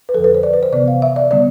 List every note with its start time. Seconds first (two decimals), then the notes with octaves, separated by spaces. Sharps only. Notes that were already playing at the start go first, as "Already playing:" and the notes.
0.09 B4
0.14 F2 D3 F3 A4
0.24 B4
0.34 C5
0.43 D5
0.53 B4
0.63 C5
0.73 C3 E3 B3 D5
0.88 F5
1.02 E5
1.16 D5
1.31 D3 G3 B3 D5